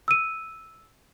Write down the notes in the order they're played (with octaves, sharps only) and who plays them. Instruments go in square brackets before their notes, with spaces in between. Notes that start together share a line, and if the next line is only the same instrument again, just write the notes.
[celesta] E6 D#7